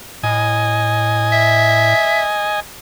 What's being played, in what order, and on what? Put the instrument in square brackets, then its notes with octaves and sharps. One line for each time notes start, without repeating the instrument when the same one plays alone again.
[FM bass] A2 [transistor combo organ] D#5 G#5
[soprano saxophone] E5